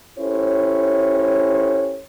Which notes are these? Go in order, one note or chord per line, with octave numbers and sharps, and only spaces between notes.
C#4 E4 G4 A4 C5 C#5